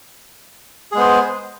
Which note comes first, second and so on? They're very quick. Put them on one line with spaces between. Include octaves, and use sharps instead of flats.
G#4 G#3 B3 C5